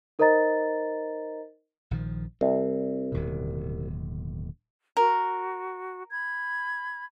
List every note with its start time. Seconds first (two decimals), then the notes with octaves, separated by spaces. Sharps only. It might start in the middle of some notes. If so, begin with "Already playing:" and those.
0.19 D#4 A#4 C5 D#5 A#5 A6
1.91 A#1 D#3 F3
2.41 C2 C4
3.12 D1 D#2 B2
4.97 F#4 A#4
6.11 B5 G#6